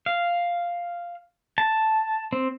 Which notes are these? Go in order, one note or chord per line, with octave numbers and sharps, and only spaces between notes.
F5
A5
C4